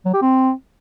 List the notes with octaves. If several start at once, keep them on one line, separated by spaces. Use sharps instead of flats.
F#3
G4
C4